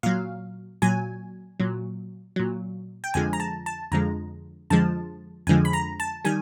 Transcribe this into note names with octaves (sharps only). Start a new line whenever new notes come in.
A#2 F#3 F5
A#2 F#3 G#5
A#2 F#3
A#2 F#3
G5
F2 D3 F3 G#3 G#5
A#5
A5
A5
F2 D3 F3 G#3 A#5
F2 D3 F3 G#3 A5
F2 D3 F3 G#3 G#5
B5
A#5
A5
D#3 G3 G#5